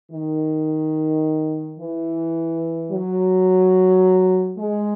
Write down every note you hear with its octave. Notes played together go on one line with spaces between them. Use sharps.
D#3
E3
F#3
G#3